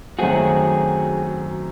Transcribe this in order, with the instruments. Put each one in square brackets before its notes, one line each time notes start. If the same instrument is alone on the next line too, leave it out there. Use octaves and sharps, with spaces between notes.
[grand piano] F#2 D#3 F#3 A3 C4 [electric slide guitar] F#4 G#4